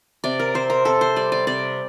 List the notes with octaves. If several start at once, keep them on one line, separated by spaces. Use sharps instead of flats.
C3 D5
A#4
C4 C5
A#4
C4 A4
C5
G3 D5
D5
C3 D5